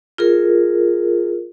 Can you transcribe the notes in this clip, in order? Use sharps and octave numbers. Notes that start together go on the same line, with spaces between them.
F4 G#4 A#4